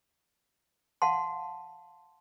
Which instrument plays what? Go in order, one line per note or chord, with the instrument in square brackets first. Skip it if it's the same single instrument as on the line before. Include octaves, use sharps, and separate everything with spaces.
[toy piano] F5 F#5 A5 C6